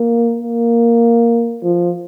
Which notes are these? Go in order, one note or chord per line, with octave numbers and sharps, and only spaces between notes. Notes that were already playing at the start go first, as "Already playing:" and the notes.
Already playing: A#3
A#3
F3